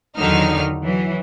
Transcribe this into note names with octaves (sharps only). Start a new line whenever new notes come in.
E2 D3 D#3 F#3 D#4 F6
E3 F#3